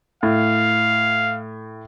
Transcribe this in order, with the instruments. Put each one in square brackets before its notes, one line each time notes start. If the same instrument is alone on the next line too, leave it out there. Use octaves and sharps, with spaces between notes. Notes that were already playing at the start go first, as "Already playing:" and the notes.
[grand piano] A2 [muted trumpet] F5